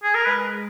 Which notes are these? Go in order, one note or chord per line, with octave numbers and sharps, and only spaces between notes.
G#4
A#4
G#3 B4